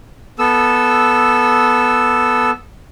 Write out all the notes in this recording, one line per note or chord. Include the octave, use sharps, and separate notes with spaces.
B3 A4 E6